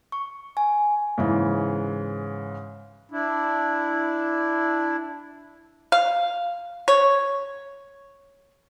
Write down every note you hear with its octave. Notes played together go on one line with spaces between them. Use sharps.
C#6
G#5
G#2 C#3 E3
D4 E4
F5
C#5